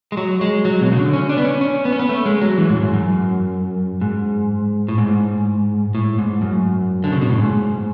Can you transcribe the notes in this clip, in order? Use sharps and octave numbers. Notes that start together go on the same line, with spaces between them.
G#3
F#3
G#3
F#3
B2
C#3
D3
C#4
D4
B3
C#4
C#4
B3
C#4
B3
A3
G#3
F#3
E3
G#2
F#2
G#2
F#2
G#2
A2
G#2
A2
G#2
F#2
D3
C#3
B2
A2
G#2